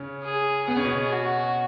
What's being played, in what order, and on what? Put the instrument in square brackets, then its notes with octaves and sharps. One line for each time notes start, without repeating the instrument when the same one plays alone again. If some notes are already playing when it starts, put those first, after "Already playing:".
Already playing: [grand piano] C#3 C#4
[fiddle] G#4
[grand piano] B3 [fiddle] G#4
[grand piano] C#4
B2 B3
[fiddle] F#4